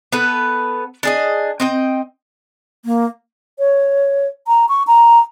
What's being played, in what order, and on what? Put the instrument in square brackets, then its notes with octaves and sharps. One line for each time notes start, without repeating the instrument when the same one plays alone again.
[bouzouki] B3 A4 B4
D4 G#4 D#5
C4 D#5 G5
[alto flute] A#3
C#5
A#5
C#6
A#5